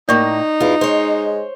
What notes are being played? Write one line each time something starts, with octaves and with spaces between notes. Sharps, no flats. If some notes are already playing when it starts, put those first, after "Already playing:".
A2 A#3 D#4 D5 C#6
E2 E4 F4
G#3 C5 C#5